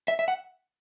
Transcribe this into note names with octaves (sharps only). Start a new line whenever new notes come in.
E5
E5
F#5